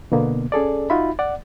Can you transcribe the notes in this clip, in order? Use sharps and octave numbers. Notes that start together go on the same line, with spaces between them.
B2 D3 A#3 B3
C#4 G#4 A4 D5
D#4 F4 F#4 E5 B5
D5 F#5